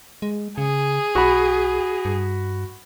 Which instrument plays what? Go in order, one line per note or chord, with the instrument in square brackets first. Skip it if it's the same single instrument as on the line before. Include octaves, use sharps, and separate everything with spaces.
[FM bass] G#3
[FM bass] C#3 [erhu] G#4
[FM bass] B1 [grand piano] F#4 B5
[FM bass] G2